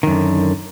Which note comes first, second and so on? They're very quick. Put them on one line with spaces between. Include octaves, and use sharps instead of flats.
D#3 F#2 D3